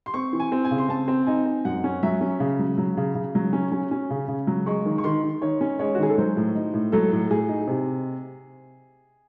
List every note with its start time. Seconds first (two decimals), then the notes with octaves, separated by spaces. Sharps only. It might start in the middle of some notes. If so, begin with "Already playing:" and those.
0.06 C6
0.14 C4 C#6
0.33 E3
0.40 G#5
0.52 C4
0.65 G#5
0.71 C#3
0.78 C6
0.89 C4 A5
1.08 C4
1.27 D#4 G#5
1.46 C4
1.65 F#2 F#5
1.84 C#4
2.03 F#3 E5
2.21 C#4
2.40 C#3
2.59 F#3
2.78 F#3
2.97 C#3
3.15 C#3
3.35 F#3
3.53 C#4
3.72 C#4
3.91 C#4
4.10 C#3
4.28 C#3
4.47 F#3
4.66 G#3 C#6
4.85 D#3
4.98 C#6
5.04 D#3 C6
5.23 D#3
5.42 D#3 C#5
5.61 C#4
5.79 G#3 C#5
5.95 F#4
5.99 D#3 G#4
6.10 A4
6.18 F#3 C5
6.37 A2
6.55 D#4
6.74 A2
6.92 F#3 A4
7.12 A2
7.30 A2 G#4
7.49 D#4
7.68 C3